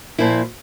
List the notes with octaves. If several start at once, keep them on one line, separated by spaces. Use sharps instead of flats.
A#2 F3 A#3 E4